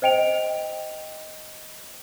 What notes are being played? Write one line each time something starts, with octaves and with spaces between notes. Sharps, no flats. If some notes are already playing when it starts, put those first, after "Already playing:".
C5 D#5 G5 D7 F7